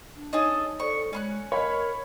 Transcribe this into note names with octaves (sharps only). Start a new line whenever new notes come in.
D4
D#4 G#4 A4 C#5 D#5
A4 C5 D5 C#6
G#3 C#4 C6 F#6
A#4 C#5 D#5 F5 B5